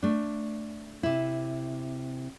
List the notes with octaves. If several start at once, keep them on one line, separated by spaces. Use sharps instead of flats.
A3 D4
C3 E4